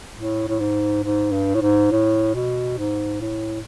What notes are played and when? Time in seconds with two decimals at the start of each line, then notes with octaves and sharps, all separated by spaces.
0.16 A2
0.48 A2
0.60 G#2
1.04 G#2
1.32 G2
1.55 A2
1.62 G#2
1.91 A2
2.34 B2
2.78 G#2
3.21 A2